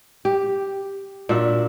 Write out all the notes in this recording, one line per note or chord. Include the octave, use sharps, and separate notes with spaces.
G4
A#2 D4 F#4 E5